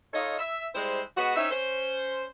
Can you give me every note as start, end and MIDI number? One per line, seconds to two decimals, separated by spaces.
0.13 0.34 63
0.13 0.34 65
0.13 0.34 69
0.13 0.34 73
0.13 0.34 75
0.39 0.67 76
0.75 1.01 55
0.75 1.01 56
0.75 1.01 64
0.75 1.01 72
1.17 1.34 56
1.17 1.34 59
1.17 1.34 66
1.36 1.49 60
1.36 1.49 61
1.36 1.49 63
1.36 1.49 76
1.51 2.25 61
1.51 2.25 72